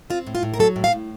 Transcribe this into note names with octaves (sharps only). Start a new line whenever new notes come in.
C4 F4
A2
F4
A2
A#4
F#3 A4
A2
F5
A2